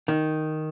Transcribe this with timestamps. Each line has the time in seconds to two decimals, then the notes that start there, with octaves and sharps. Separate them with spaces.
0.08 D#3